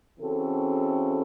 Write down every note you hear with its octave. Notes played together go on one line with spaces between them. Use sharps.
C#3 E3 C4 F#4 A4